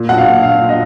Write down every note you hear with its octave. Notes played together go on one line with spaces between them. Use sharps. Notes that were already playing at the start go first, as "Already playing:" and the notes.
Already playing: A#2
B1 F#5
F5
A#2
A#2 F5
A#2
D#5